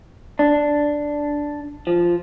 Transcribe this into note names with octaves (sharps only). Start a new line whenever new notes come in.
D4
F3